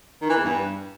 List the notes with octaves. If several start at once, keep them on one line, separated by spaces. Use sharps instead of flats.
D#3
E3
E2
G2